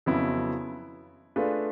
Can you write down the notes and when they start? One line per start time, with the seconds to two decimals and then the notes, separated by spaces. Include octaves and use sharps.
0.06 F2 C#3 F#3 B3 E4
1.36 A3 D4 F4 G#4 B4